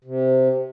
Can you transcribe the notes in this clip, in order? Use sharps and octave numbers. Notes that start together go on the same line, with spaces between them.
C3